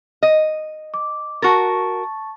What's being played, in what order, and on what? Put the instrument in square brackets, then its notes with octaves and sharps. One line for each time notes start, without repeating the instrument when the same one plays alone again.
[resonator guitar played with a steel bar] D#5
[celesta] D6
[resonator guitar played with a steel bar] F#4 A#4 [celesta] A5 C#6 A6